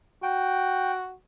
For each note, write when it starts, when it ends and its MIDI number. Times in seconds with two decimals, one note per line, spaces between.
0.23 1.14 66
0.23 0.92 79